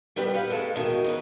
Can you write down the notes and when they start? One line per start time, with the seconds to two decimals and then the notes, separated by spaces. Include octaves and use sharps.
0.16 G3 B3 G4 B4
0.34 B4 F5 F#5
0.50 D#2 G#3 A4
0.75 E2 B2 D#3
1.04 C#3 D#4 B4